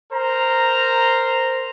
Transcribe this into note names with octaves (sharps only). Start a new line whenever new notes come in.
A#4 C5 A#5